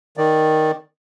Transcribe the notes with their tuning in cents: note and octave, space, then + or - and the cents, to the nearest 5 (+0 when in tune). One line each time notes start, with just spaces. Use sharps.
D#3 +0 D5 +0